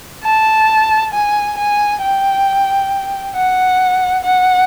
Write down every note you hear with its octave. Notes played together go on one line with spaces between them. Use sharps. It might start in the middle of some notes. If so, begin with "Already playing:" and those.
A5
G#5
G#5
G5
F#5
F#5